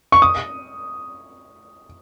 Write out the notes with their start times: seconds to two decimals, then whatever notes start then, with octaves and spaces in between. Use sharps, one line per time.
0.12 C#6
0.22 D#6